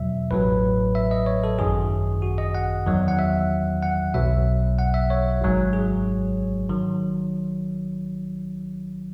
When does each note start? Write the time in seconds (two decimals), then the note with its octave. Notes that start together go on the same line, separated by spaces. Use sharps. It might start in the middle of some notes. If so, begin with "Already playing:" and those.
Already playing: E2 B2 F#3 E5
0.31 A1 A2 F#3 B4
0.95 E5
1.11 D#5
1.26 C#5
1.44 A4
1.59 G#1 F#2 D#3 G#4
2.22 F#4
2.38 D#5
2.55 F#5
2.86 E2 D#3 F#3
3.08 F#5
3.19 E5
3.83 F#5
4.14 B1 B2 F#3 E5
4.79 F#5
4.94 E5
5.10 C#5
5.41 G#1 G#2 F#3
5.73 G#4
6.69 D#3 F#3